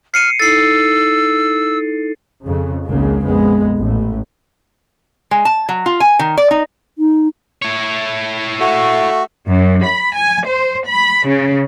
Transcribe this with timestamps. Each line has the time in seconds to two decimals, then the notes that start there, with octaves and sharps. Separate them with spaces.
0.14 F6 C7 C#7 D#7
0.40 D#4 E4 A4 E6 A6 C7
2.45 F2 C#3
2.87 G#1 C#2 C#3 G#3 A#3
3.24 A#1 F2 G#3 B3
3.79 A1 A2
5.31 G#3
5.45 A5
5.69 F#3
5.86 F4
6.00 G#5
6.19 D#3
6.37 D5
6.51 D#4
6.98 D#4
7.62 E4 C#5
8.60 A3 F#4
9.47 F#2
9.85 B5
10.17 G#5
10.47 C5
10.88 B5
11.28 C#3